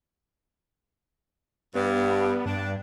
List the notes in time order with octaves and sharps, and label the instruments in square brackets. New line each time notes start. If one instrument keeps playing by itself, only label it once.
[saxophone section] G2 [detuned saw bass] B3
[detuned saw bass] G2 [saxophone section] D4